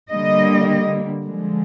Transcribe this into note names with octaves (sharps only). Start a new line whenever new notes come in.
D3 G3 A#3 D#5
D3 F3 G#3